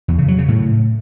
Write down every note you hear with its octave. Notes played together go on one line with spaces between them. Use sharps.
E2
C#3
F#3
C#3
A2